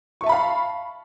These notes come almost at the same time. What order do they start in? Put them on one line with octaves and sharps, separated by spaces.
C#6 E5 A5 B5 F5